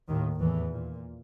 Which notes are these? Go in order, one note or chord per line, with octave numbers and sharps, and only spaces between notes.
D#2 A2 D#3
E2 A2 E3
A#2